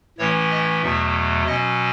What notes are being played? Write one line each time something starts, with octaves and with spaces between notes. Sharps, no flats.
A2 E3 A3 C#4 C#5
D#5
E2 B2 F#3 A3 E5
B2 F#3 C#4 D#5